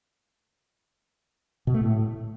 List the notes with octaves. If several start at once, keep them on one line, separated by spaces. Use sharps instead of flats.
B2
A3
A2